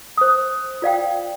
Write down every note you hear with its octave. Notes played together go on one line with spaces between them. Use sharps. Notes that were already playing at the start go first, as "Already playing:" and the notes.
C5 D#6
F4 D5 F5 G5